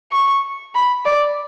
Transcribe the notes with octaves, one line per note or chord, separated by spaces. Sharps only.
C#6
B5
D5